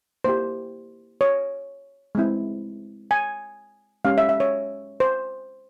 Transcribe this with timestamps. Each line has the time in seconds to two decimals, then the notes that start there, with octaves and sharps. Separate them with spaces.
0.24 A#3 E4 G4 C5
1.21 C#5
2.15 G#3 C4 E4
3.11 G#5
4.05 G#3 C#4 G4 F5
4.18 E5
4.29 E5
4.40 C#5
5.00 C5